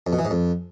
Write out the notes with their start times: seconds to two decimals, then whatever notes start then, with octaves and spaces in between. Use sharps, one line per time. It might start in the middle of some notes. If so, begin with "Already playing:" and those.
0.07 F2
0.13 B2
0.19 E3
0.25 G#2
0.31 F2